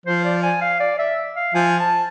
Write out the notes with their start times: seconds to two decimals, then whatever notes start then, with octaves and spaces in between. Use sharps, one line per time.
0.06 F3 C5
0.25 D5
0.43 G#5
0.61 F5
0.80 D5
0.99 E5
1.37 F5
1.54 F3 G#5
1.80 A5